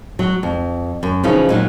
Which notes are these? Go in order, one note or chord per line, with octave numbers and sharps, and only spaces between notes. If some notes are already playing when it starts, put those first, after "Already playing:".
F#3
F2
F#2
C#3 E3 F3 C#4 D#4
A#2 F#3 D#4